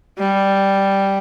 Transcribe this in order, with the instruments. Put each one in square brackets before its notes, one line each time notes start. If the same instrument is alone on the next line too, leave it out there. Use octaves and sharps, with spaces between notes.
[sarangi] G3